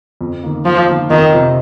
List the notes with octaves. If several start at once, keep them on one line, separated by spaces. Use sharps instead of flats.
F2
D#3 A#3
F2 F3
D#3 A#3
F2 D#3
C3 F3 C4